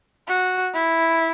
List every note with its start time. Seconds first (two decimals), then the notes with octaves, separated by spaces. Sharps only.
0.28 F#4
0.74 E4